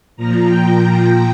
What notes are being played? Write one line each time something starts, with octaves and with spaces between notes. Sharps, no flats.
A#2 F3 A#5
G5
A#5